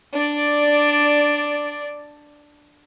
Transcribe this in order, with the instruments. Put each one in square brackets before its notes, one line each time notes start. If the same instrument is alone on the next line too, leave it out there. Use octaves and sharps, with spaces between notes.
[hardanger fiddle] D4 D5